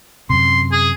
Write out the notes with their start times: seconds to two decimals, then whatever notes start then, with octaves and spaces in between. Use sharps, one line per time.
0.30 F#2 C3 C6
0.72 G#4